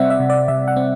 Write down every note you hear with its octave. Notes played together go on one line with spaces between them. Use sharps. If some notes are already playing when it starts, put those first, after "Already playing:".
Already playing: C3 G3 C4 D5 E5 F#5
E5
C3
D5
C3 E5
F#5
C4